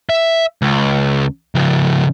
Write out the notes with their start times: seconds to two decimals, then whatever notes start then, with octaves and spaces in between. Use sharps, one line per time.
0.10 E5
0.62 C#2
1.55 C#3 F3